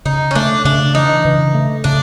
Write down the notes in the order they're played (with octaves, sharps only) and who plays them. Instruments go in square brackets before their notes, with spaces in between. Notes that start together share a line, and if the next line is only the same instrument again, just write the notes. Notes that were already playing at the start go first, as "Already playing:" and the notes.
[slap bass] C#3 [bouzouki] D#4
[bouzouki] C#4
[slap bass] A3 [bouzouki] D4
[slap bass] C#3 [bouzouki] D4
[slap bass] E3 [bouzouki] D#4
[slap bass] C#3
A3
[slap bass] C#3 [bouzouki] D4